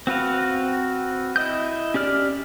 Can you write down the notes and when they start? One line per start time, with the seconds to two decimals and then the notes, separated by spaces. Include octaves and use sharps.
0.07 C4 F#4 B4 F5
1.36 E4 D#5 D#6 G6
1.94 C#4 G4 D5 F6